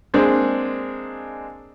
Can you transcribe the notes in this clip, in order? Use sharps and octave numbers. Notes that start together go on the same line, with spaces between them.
G#3 A#3 C4 D4 G#4 D#5